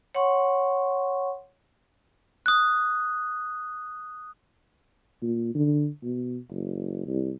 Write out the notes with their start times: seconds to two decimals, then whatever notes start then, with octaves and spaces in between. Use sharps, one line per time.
0.15 C#5 F#5 C6 C#6
2.46 D#6 F#6
5.22 A#2
5.54 D3
6.03 B2
6.50 F#1
7.06 C2